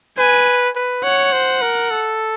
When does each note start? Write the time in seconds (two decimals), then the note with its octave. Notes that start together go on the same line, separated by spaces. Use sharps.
0.18 B4 G#5
0.75 B4
1.04 C#5 F#5
1.32 C5
1.62 A#4
1.90 A4